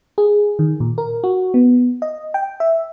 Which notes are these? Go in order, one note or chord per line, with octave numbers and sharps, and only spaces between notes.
G#4
D#3
A#2
A#4
F#4
B3
D#5
G5
E5